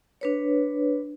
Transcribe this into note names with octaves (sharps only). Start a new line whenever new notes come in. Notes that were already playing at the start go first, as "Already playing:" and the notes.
D4 B4 C#5